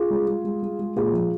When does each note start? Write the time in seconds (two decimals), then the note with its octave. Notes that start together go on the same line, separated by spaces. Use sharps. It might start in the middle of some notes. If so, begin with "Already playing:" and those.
Already playing: F4 G#4
0.10 G#3
0.27 G#3
0.44 G#3
0.62 G#3
0.79 G#3
0.96 A#2 F4 G#4
1.13 F3